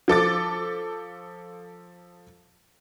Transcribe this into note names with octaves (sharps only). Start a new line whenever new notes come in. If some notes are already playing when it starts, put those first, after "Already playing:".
F3 A4 D6 A6